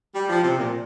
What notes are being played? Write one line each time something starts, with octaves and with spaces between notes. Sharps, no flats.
G3
F3
C3
A#2